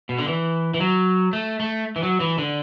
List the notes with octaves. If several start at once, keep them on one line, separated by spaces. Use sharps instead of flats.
B2
D3
E3
E3
F#3
A3
A3
E3
F#3
E3
D3